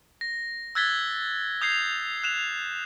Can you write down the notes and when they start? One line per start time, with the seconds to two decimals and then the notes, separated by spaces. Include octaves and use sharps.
0.21 A#6
0.75 E6 F#6 G#6 A6 B6 G7
1.61 D#6 G6 G#6 C7 F7
2.23 F#6 E7 F7